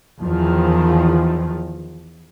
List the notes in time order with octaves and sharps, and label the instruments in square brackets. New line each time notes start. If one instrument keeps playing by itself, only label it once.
[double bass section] E2 D#3 F3